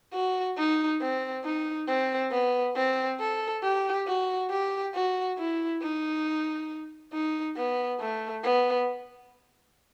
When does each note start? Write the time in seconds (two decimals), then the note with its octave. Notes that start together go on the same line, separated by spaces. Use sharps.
0.13 F#4
0.58 D#4
1.01 C4
1.45 D#4
1.88 C4
2.31 B3
2.76 C4
3.20 A4
3.63 G4
4.07 F#4
4.50 G4
4.95 F#4
5.38 E4
5.82 D#4
7.13 D#4
7.57 B3
8.00 A3
8.44 B3